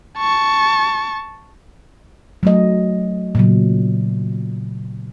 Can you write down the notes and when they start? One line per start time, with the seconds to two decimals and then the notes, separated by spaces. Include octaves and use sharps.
0.18 A5 C#6
2.43 F#3 A3 D#5
3.35 A#2 C#3 F#3